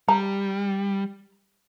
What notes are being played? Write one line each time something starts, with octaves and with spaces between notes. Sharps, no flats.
G3 A#5